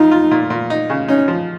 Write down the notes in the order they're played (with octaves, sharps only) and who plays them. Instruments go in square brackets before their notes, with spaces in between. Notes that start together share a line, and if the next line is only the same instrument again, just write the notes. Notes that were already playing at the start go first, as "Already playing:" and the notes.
Already playing: [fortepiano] F2 F4 [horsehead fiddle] D#4
[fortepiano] F4
A#2
A#2
D#4
C#3
[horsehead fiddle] C#4 [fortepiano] D#4
[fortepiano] F3